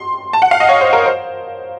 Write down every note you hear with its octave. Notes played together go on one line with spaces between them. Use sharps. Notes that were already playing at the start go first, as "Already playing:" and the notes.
Already playing: C6
A5
F#5
F5
D#5
C#5
C5
A#4
C5